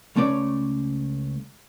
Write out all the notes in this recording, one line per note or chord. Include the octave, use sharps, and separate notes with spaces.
C#2 A3 C#4 C#5 D5